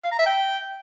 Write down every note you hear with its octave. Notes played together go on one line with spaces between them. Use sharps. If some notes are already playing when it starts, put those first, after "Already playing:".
F5
A#5
E5
G5